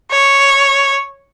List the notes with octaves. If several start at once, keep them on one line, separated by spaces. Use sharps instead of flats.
C#5